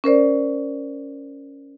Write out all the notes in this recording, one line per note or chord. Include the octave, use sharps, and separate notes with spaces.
C#4 A#4 C5 D5